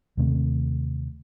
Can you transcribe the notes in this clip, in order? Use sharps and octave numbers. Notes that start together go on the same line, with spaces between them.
D#2 C3 A3 C4